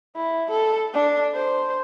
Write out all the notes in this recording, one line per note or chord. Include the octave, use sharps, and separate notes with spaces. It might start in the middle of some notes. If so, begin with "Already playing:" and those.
E4
A4
D4
C5